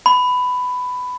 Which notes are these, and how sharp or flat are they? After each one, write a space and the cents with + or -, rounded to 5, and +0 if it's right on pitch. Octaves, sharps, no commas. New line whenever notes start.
B5 +15